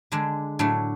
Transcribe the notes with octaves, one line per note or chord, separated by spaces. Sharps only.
D3 G#3 D4
A2 F#3 A3 D4